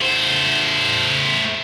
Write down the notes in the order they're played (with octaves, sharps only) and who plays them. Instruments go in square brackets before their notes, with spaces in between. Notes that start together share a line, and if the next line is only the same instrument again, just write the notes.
[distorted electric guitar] A3 C5